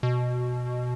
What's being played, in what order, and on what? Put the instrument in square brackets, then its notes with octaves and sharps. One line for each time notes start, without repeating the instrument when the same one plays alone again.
[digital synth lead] B2